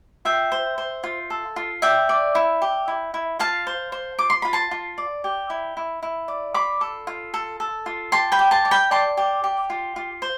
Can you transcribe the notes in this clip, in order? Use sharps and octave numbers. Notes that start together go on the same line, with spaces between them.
F4 E5 G5
C5
C5
F4
A4
F4
D5 E5 G5
D5
E4
G4
E4
E4
F4 F5 A5
C5
C5
F4 D6
C6
F4 B5
A5 C6
F4
D5
G4
E4
E4
E4
D5
F4 B5 D6
A4
F4
A4
A4
F4
G4 A5 C6
G5 B5
G4
A5 C6
D5
G5 B5
D5 A5 C6
G4
G4
F4
F4
C5